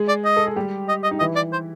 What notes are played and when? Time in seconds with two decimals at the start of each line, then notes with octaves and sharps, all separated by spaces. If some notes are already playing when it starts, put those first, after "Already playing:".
Already playing: G#3 G#4
0.08 D5
0.25 D#5
0.37 A4
0.47 G#4
0.56 G3 G4
0.89 D#5
1.04 D#5
1.11 D#4
1.20 E3 E4 D#5
1.36 D5
1.52 C5